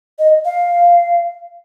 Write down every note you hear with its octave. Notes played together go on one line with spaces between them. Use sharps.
D#5
F5